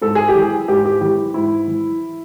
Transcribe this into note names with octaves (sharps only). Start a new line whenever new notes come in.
G#2 A4
G#4
G4
E3
G#4
G#2 G4
G4
E3 G4
G#2 E4
E3